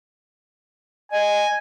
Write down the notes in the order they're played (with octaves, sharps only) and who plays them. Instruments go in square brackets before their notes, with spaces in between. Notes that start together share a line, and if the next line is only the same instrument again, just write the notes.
[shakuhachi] D#5 [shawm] G#5